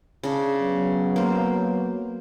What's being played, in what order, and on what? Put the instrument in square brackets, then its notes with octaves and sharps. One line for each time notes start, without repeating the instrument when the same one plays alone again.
[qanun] C#3 D4
[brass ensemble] F#3 B3
[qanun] A#3 C5